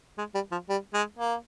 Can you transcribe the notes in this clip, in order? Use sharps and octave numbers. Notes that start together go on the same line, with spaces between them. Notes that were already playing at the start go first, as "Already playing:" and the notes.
G#3
G3
F3
G3
G#3
A#3